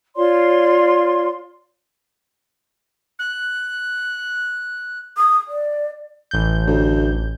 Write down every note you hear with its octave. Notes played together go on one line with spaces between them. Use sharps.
F4 C#5 D5 C6
F#6
D#6
D5
A1 G6
D2